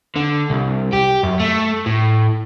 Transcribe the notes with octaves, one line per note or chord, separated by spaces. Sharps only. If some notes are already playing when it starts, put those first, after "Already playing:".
D3
C2
G4
F#2
A3
A2